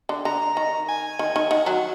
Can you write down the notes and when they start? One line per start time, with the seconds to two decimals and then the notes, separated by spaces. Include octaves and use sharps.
0.09 D3
0.25 D3 A#5
0.57 D#3
0.88 G#5
1.19 D#3
1.36 D#3
1.51 D#3 F#5
1.66 F#3